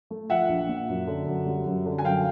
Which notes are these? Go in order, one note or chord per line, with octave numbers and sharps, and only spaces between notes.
A3
F3 E5 F#5
A#1
A#2
F#2
D3
F#2
G3
F#2
D3
G#5
F#2 F5 G5